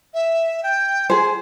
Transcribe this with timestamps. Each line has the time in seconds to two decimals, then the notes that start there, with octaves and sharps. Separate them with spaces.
0.14 E5
0.63 G5
1.10 G#4 C5 G#5